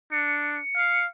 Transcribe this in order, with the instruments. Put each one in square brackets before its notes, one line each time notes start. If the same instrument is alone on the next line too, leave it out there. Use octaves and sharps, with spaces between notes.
[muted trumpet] D4 [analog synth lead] C#7
[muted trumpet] F5